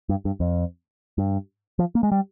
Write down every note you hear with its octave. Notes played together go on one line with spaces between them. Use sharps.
G2
G2
F2
G2
F3
A#3
G#3
G3